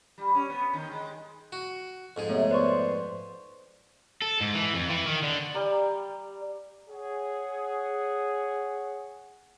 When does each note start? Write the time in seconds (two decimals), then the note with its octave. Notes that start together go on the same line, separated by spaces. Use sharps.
0.18 G3
0.35 C#4
0.50 B3
0.73 D#3
0.92 G#3
1.52 F#4
2.16 F2 G#2 G#4
2.30 C3 A3 B3 C#5
2.51 B4 C5 D5 C#6
4.22 A4
4.41 G#2
4.54 E3
4.74 F2
4.89 E3
5.06 D#3
5.23 D3
5.54 G3 A#5
6.89 G#4 C#5 F#5